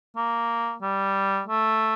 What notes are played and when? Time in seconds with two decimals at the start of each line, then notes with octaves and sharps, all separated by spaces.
0.16 A#3
0.82 G3
1.47 A3